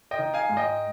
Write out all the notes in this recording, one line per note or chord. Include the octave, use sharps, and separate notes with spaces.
D#5 G5
D#3
F5 G#5
G#2
D#5 G5